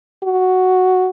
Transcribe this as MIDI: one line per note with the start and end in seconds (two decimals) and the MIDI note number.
0.23 1.10 66